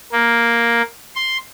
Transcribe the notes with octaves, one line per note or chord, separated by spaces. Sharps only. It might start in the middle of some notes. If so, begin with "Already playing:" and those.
A#3
C6